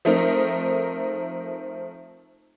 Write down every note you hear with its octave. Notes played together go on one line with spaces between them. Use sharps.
F3 A3 C4 D#4 A#4